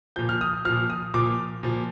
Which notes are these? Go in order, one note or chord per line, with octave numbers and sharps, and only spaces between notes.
A#2 F3 G6
F6
D#6
A#2 F3 F6
D#6
A#2 F3 D6
A#2 F3